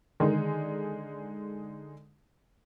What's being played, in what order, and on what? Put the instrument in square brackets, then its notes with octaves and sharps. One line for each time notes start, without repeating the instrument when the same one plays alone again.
[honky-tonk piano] D3 G#3 D#4 [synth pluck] D#3